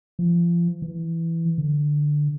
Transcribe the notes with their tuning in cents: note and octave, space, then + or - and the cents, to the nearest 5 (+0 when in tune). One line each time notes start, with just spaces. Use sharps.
F3 -30
E3 +5
D3 +5